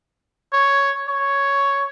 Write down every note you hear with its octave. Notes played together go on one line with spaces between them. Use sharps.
C#5
C#5